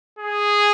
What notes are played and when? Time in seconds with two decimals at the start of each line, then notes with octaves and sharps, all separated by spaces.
0.19 G#4